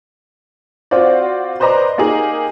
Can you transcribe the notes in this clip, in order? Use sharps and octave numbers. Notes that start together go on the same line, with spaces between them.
C4 F4 F#4 C5 D5
B4 C5 D5 D#5 A#5 D6
A#3 D#4 G4 G#4